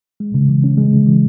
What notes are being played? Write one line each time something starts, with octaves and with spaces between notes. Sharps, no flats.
G#3
C#3
E3
C#4
G#3
C#3
E3